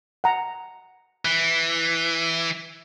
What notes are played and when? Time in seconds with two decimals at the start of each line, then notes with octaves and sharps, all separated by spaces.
0.24 F#5 A#5
1.25 E3